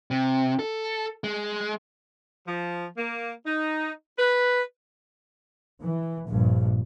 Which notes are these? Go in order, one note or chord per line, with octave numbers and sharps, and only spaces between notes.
C3
A4
G#3
F3
A#3
D#4
B4
E3
A#1 G2